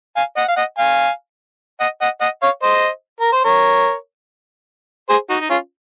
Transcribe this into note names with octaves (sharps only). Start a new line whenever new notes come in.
F5 G#5
D#5 F#5
F5
D#5 F#5
F5 G#5
D#5 F#5
D#5 F#5
D#5 F#5
C#5 F5
C5 D#5
A#4
C5
A#4 C#5
G#4 C5
D#4 F#4
D#4
C#4 F4